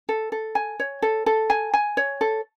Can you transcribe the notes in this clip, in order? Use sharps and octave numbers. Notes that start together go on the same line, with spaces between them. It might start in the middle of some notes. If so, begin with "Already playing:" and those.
A4
A4
G#5
C#5
A4
A4
G#5
G#5
C#5
A4